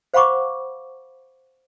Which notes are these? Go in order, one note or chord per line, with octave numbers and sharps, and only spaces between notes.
C5 F5 F#5 B5 C#6 D6